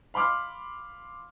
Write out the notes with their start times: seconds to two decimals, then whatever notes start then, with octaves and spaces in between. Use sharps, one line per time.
0.14 F5 B5 C6 D6 F6